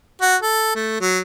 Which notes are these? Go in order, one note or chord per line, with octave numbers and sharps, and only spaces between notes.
F#4
A4
A3
F#3